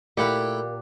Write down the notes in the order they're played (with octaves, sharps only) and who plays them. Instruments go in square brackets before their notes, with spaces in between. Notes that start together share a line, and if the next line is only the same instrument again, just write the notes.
[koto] A#2 [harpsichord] A3 E4 G5 [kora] G4 F#5